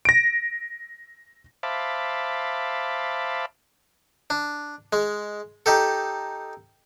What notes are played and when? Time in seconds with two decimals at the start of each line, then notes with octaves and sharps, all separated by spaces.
0.05 A#6 D7
1.63 C5 E5 F5 A5 B5 D6
4.30 D4
4.93 G#3
5.66 D#4 G4 A4